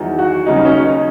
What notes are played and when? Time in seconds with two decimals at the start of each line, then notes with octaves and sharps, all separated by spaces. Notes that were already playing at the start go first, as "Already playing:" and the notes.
Already playing: E2 D#3 F#3
0.19 F#4
0.46 D#2 C#3 F#3 D#4
0.65 C#4
0.75 D#4